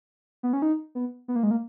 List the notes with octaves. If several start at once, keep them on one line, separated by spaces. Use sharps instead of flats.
B3
C#4
D#4
B3
B3
A#3
G#3
A#3